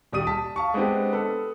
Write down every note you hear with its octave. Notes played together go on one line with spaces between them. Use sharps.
D#1 G3 D5 D#6 D#7
A5 B6
F5 A5 C#6
G#3 B3 C4 D4 G4
A4 B4